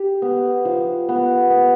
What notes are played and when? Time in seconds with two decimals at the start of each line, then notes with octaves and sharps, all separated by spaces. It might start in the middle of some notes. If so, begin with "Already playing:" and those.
Already playing: G4
0.22 B3
0.65 F3
1.09 B3
1.50 B3